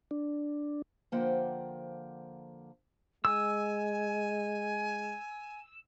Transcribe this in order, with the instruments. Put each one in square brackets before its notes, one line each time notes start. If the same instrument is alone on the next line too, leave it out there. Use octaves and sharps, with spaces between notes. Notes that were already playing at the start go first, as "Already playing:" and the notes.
[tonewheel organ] D4
[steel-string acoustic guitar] D3 F3 A#3 C5 F#5 G5
[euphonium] G#3 [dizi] G#5 [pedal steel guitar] E6